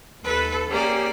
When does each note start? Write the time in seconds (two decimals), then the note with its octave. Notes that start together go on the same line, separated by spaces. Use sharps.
0.24 D#2 A4 B4
0.70 A#3 C#4 G4 G#4 D5